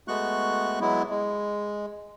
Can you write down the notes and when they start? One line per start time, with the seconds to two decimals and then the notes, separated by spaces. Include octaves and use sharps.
0.08 G#3 A3 B3 F#4 C#6 F#6
0.81 F#3 G#3 B3 E4
1.10 G#3